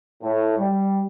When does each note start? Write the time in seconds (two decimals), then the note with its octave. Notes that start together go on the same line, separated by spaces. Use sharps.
0.22 A2
0.58 G3